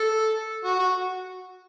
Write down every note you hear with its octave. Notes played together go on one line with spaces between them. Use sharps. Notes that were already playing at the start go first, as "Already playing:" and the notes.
Already playing: A4
F#4
F#4